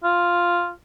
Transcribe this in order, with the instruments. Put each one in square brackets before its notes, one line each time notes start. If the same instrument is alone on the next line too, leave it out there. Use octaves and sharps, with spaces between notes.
[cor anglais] F4